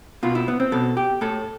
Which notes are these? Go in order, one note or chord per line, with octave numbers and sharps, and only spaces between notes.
B2 F4
E4
B3
C4
B2 A4
G4
A2 A4